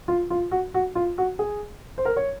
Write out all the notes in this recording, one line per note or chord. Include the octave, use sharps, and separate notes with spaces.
F4
F4
F#4
F#4
F4
F#4
G#4
C5
A#4
C#5